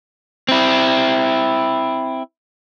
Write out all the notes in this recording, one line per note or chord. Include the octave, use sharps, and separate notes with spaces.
C4 E4